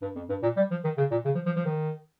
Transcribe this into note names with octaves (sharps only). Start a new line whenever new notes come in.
G2
F2
G2
A#2
G3
F3
D#3
C#3
A#2
C#3
F3
F3
F3
D#3